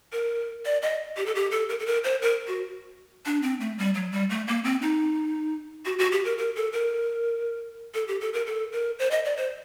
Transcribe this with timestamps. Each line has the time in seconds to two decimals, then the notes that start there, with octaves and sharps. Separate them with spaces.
0.12 A#4
0.66 D5
0.82 D#5
1.17 G4
1.26 A4
1.35 G4
1.51 A4
1.69 A#4
1.79 A4
1.86 A#4
2.04 C5
2.22 A#4
2.47 F#4
3.26 D4
3.42 C4
3.61 A3
3.78 G3
3.94 F#3
4.12 G3
4.30 A3
4.48 A#3
4.64 C4
4.82 D#4
5.85 F#4
5.99 F#4
6.12 G4
6.25 A#4
6.38 A#4
6.56 A4
6.73 A#4
7.95 A4
8.08 G4
8.21 A4
8.34 A#4
8.47 A4
8.72 A#4
8.99 C5
9.11 D#5
9.25 D5
9.37 C5